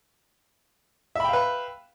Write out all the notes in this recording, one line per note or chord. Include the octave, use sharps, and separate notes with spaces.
B4 E5 F5 G5 B5